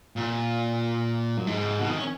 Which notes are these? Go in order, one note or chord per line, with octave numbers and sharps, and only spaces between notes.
A#2
F#2
G#2
B2
D#3
C#4